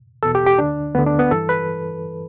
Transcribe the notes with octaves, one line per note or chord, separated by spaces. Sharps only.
E2 B2 A4
G4
G4
D2 D3 D4
D2 D3 B3
D4
B3
G2 E3 A4
B4